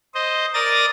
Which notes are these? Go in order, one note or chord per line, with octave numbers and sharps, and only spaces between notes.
C5 D#5
A#4 D5 D#6 A6 A#6